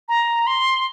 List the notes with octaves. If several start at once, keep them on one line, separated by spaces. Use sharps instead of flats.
A#5
C6